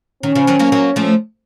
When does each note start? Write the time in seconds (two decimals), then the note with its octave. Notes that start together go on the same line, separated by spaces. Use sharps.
0.23 D#3 C#4
0.35 C#3 F3
0.47 D#3 F#3
0.59 F#3 A#3
0.72 F#3 A#3
0.96 F3 A3